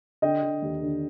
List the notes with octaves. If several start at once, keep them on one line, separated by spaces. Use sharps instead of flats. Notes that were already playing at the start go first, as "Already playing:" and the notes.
D3 D#5 G5
D3
D#2
D3